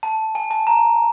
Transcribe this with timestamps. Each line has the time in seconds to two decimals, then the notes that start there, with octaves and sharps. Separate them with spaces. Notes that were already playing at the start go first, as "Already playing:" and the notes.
0.03 A5
0.35 G#5
0.51 A5
0.67 A#5